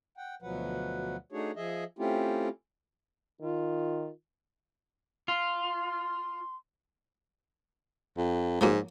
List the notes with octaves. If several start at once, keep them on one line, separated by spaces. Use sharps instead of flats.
F#5 G5
D2 B2 F3 F#3 B4 F#5
A3 D4 D#4 F#4 G#4 C#5
F3 G#4 D#5 E5
A3 C4 C#4 E4 F4 G4
D#3 F4
F4 C6
F2
G#2 F3 F#3 A#3